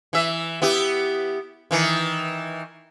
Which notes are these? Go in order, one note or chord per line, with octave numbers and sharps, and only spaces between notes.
E3 E5
B3 E4 G4
D#3 E3